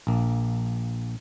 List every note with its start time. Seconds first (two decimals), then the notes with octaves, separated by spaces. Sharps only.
0.07 A#1 A#3